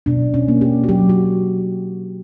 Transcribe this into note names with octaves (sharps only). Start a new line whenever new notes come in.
B2 D4
C#4
A#3
G4
F#4
F#3 G4
F#4